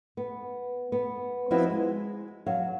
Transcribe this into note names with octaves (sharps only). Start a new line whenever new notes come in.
B3
B3
F3 B3 C4 E4 F#4 D#5
G#3
F#3 F5